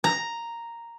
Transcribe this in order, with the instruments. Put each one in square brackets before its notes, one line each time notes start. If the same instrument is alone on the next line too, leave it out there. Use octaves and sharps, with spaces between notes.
[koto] A#5